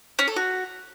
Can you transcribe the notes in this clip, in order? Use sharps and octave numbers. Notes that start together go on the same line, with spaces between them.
C#4
A4
F#4